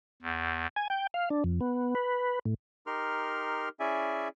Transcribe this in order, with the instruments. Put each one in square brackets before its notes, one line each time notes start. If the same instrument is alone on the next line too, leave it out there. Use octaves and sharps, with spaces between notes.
[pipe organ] E2
[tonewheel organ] G#5
G5
F5
D4
F2
B3
B4
A2
[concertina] D#4 G4 A#4 C6 F6
C#4 E4 G#4 D5 E5 G#5